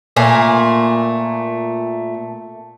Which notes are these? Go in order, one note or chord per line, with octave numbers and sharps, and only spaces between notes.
A#2 A3 G#5